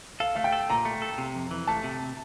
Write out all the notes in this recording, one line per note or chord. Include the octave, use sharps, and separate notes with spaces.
A4 F5
A3 F5
G5
A4
A#2 A#5
A3
A4
C3
F2
E3
A3 A5
C3